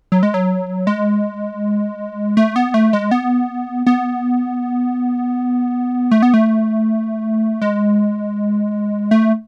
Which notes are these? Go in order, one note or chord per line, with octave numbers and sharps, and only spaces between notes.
F#3
G#3
F#3
G#3
A3
B3
A3
G#3
B3
B3
A3
B3
A3
G#3
A3